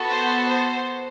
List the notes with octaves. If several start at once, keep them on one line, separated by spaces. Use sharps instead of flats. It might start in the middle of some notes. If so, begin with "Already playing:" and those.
Already playing: B3 F#4 A4
C5
C5